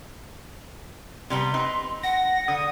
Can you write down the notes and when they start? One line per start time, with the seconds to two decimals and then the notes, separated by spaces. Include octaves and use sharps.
1.30 C3 G3 B3 C6
1.54 C4 D#4 B4
2.03 F#5 A#6
2.48 D3 D#6